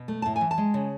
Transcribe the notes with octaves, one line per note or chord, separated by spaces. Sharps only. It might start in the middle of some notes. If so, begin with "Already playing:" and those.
Already playing: B2
A3
A2 A5
G#5
E3
A5
G#3
C#3